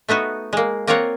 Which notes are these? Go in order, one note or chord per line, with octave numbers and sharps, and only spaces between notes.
A3 B3 D#4 F#4
G#3 A#3
A#3 C4 F4 A#4 C#5 F#5